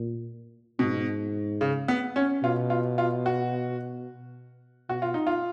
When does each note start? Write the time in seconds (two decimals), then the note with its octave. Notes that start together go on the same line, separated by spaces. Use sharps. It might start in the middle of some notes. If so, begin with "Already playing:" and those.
Already playing: A#2
0.79 G#2 B2
1.61 C#3
1.88 B3
2.16 C#4
2.43 B2 F4
2.70 F4
2.98 F4
3.26 F#4
4.88 B2 F#4
5.02 F4
5.14 D#4
5.27 F4